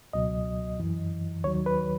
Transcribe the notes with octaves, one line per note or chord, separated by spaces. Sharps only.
C#2 B2 F#3 D#5
F#2 E3
D#2 D#3 F#3 C#5
B4